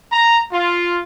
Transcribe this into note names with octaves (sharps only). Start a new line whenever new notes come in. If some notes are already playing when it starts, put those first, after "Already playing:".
A#5
F4